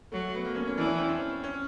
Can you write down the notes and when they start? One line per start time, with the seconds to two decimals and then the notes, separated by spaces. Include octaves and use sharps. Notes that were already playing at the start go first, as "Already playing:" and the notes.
0.12 F#3 A3
0.35 B3
0.45 A#3
0.55 C#4
0.67 C#4
0.78 E3 D4
0.88 C#4
0.98 C4
1.08 C#4
1.44 C#4